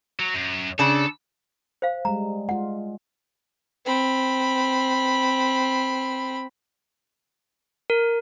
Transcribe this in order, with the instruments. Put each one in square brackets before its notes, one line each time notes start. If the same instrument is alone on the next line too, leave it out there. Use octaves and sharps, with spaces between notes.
[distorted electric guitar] F#3
F#2
[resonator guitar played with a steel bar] C#3 D4 [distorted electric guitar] A4
[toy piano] C5 F5
[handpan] G3 G#3 [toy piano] A#5
[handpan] G#3 F4 [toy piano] F#5
[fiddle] C4 B5
[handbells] A#4